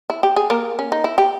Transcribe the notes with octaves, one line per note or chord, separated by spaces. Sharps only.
E4
G4
G#4
A#3 A#4
C#4
D#4
E4
G4